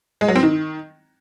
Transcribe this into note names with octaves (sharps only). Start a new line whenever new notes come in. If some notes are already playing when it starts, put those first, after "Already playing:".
G#3
F#3
C4
D#3